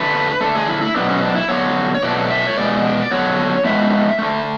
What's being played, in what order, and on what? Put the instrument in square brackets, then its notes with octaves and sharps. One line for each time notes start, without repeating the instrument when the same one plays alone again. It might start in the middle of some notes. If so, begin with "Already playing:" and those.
Already playing: [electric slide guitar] D3 A3 B4
D3 A3 A4
G#4
E4
E4
B2 F#3 B3 D4
C#4
D4
E4
D3 F#3 B3 C#5
C#5
B2 F#3 A3 D5
E5
C#5
B2 G#3 B3 D5
D3 F#3 B3 C#5
A2 G#3 B3 E5
D3 A3